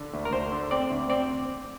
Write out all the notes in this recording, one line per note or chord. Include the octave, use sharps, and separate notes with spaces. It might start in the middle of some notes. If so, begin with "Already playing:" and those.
Already playing: D3
D2
A#4
D2 C5
D3
C4 D5
D2
C4 D5